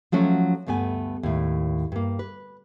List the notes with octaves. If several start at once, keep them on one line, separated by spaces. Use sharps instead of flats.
F3 F#3 A3 C#4 F#4
D2 G2 A3 B3 G#5
D#2 A2
G2 A#3
B4